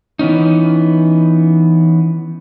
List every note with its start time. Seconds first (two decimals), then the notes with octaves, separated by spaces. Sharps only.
0.19 E3 B3 C#4 D#4